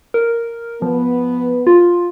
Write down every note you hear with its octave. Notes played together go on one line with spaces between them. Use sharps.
A#4
F3 B3
F4